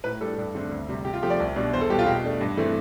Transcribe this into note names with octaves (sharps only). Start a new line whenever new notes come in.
A2 B4
G3 D4 A4
G2
D3 A3 C4
D2
C3 G3
C3 G4
F4
F3 A3 C4 G4
D5
C2
B2 G3 D4
E2 C5
A4
B2 G3 G4
F4
B2 G4
A3 D4
G2
E3 A3 C4